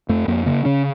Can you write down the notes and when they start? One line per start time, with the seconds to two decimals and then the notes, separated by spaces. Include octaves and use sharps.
0.09 F2 A3
0.28 F2 A#3
0.46 C#3 A#3
0.65 C#3 C#4